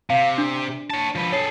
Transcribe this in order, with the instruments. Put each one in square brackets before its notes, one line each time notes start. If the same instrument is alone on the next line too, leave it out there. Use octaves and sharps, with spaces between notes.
[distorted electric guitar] C3 [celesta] F5
[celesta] D4
[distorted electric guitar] C#5 A5
F3 B4
[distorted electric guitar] G#4 A4 [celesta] C#5 C7